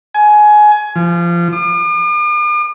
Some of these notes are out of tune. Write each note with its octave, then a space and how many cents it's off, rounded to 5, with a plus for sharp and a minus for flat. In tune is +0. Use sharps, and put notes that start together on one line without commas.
G#5 +20
F3 -25
D6 +45